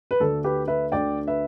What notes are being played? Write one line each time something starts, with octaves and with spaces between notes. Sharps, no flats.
B4
D2 D3 A3 D4 A4
G4 B4
B4 E5
D2 D3 A3 D4 D5 G5
B4 E5